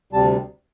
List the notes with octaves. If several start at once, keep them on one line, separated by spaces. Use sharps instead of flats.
D2 C3 G3 A5